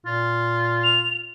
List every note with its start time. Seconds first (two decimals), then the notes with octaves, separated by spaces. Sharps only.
0.06 A#2 F4
0.84 F7